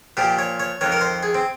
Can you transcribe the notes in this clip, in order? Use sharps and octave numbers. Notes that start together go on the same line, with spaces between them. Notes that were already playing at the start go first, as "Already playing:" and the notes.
A#2 F3 G4
C#5
C#5
F2 D#3 C#5
A#4
C5
G#4
C4